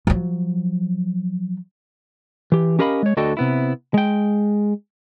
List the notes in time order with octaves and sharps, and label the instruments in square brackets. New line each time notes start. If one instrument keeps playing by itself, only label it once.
[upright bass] F3 F#3
[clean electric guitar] E3 G4
C#4 G4 A#4 D#5 F5 B5
G#3 C#5
D2 D3 F#4 A4 D#5 G5
C3 B3 E4
G#3 G5